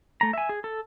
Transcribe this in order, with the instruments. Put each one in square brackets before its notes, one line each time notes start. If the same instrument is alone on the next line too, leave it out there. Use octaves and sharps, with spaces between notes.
[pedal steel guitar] A3 A#5
E5 G#5
G#4
A4